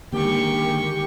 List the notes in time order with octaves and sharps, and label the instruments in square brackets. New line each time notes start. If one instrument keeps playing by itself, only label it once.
[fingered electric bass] D3 A#3 [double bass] D#3 G#3 [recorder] G4 [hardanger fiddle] G5 C#6